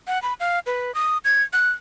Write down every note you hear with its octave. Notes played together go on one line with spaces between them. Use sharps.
F#5
B5
F5
B4
D#6
G#6
F#6